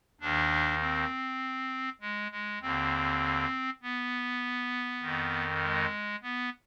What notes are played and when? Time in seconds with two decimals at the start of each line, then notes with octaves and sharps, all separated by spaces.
0.21 D#2 D#3 D4
0.81 C4
2.01 G#3
2.32 G#3
2.61 D#2 D3 C4
3.82 B3
5.02 F2 D#3
5.62 G#3
6.22 B3